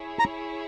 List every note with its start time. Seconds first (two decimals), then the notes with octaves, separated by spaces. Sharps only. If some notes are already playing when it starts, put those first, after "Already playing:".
Already playing: E4 G#4 C#5
0.19 A#5